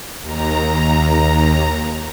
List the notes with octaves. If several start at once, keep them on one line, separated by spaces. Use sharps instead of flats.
D#2 A#5